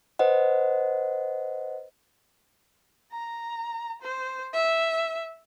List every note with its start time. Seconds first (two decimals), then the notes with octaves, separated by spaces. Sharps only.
0.19 B4 C5 D#5 F#5
3.12 A#5
4.02 C5
4.53 E5